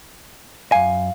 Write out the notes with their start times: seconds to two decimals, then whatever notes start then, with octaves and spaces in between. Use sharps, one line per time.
0.72 F#2 F5 G#5